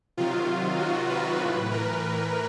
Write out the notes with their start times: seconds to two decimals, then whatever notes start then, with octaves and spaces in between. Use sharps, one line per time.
0.17 C3 D#3 F#3 F4
0.79 F#4
1.10 B4
1.41 A2 E3
1.72 A#4